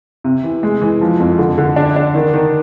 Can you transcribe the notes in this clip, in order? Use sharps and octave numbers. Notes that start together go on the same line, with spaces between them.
C3
E3
G#3
E3
F3
F2
D3
D3
D4
D4
D#3
D#3